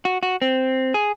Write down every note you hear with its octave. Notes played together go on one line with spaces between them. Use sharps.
F#4
F#4
C4
G#4